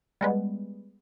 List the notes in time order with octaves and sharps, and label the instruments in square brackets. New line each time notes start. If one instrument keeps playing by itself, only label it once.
[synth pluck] G3 G#3 B3